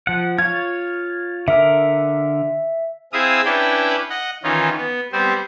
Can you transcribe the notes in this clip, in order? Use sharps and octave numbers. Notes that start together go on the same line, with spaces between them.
F3 F#5
F4 C#5 G#6
D3 A#4 E5
C4 E4 G#4 E5 F5 D#6
C#4 D4 E4 B4 D5 G5
D#5 F#5
D#3 E3 C#4 D#4 F4
B3
G3 B3 C4 C5